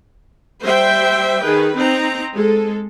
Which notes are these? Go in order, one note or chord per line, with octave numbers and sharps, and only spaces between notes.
G3 C5 E5 G5
D#3 G#4 B4
C4 D#4 A#5
G#3 A4